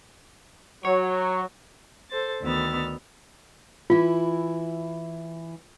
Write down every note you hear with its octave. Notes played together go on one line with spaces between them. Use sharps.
F#3 C#5
A4 C5 A6
D2 D#3 B3 E6 F6 A6
E3 E4 F4